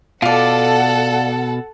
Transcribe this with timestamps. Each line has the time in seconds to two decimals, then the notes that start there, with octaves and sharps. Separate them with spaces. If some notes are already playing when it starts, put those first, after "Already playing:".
0.22 B2 F4 A4 D5 F#5